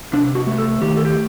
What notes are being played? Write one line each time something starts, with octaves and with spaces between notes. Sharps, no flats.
C3 D4
F#4
A3
A4
D#3 G4
A4
G4